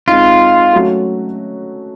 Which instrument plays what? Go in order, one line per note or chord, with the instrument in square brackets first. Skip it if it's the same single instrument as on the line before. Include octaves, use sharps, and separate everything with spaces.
[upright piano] G#3 C4 D#4 [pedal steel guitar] F4
[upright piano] F#3 A3 C#4 F#4